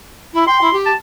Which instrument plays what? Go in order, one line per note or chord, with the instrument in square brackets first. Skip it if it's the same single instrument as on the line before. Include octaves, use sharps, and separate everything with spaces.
[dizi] E4
[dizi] G5 [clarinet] C6
[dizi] E4
G4
[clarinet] A5